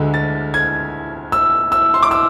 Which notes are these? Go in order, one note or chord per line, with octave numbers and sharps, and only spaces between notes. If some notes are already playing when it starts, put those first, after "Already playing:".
Already playing: D2 D3 G#3
A6
G#6
E6
E6
C6
D6
E6